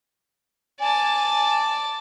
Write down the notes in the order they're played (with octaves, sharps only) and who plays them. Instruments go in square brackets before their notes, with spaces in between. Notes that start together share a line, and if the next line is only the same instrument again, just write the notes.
[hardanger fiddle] D5 A5 [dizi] G#5